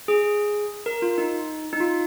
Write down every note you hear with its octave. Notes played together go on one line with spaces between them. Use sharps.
G#4
A#4
F4
D#4
D#4
F4